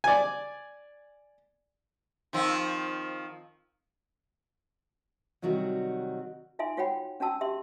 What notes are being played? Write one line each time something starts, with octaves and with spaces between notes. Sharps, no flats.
D5 G#5
D#3 F3 C4
C3 D#3 F#3 G3 F#4
D#4 F4 E5 G#5 C6
F4 F#4 C#5 F#5 G5 B5
C#4 D4 F#4 A5 E6
G4 E5 C6